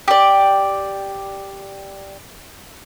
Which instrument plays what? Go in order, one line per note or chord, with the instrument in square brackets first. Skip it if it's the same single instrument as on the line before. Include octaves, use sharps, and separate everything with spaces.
[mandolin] G4 D5